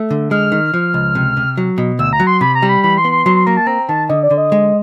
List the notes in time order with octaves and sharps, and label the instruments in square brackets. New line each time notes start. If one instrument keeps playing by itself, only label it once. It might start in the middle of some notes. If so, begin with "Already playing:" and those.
Already playing: [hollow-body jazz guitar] A3
D3
[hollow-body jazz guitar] G#3 [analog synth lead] F6
[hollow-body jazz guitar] D#3
F3
C#2
C3
C3
F#3
B2
[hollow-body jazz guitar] D2 [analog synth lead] E6
[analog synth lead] A#5
[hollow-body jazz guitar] F#3
[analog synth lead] C6
[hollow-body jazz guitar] C3 [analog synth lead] B5
[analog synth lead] A#5
[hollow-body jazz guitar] G3
[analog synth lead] B5
[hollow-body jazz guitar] E3 [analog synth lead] B5
[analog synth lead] C6
[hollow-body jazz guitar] B3
[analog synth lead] C6
[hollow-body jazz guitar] F#3 [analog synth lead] C6
[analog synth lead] C6
[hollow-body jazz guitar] A#3 [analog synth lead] A#5
[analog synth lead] A5
[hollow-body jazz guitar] C4 [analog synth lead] A#5
[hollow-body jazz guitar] D#3 [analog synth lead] A5
[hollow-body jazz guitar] D3 [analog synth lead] D#5
[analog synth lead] D5
[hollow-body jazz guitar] D3
[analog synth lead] D#5
[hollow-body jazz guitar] G#3